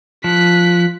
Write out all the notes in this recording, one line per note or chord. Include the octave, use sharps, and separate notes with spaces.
F3 F#6 B6